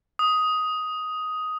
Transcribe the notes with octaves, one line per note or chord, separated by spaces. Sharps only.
D#6